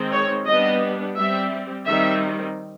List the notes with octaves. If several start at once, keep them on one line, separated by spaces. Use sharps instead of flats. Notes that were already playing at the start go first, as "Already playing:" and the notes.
Already playing: D#3 G#3 C4
C#5
G3 B3 D4 D#5
G3 C4 E5
D#3 G3 C4 E5